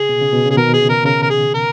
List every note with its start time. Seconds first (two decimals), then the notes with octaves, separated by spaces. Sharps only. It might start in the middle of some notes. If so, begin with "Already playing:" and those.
Already playing: C#3 G#4
0.09 B2
0.21 C#3
0.33 B2
0.45 C#3 G#4
0.57 B2 D#3 A#4
0.73 G#4
0.81 C#3
0.89 A#4
1.05 C#3 A#4
1.22 A#4
1.30 G#4
1.54 A#4